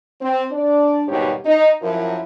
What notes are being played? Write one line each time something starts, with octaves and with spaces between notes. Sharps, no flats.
C4
D4 D5
D#2 G#2 B2 G3 G4 C#5
D#4
F#2 F3 E4 A#4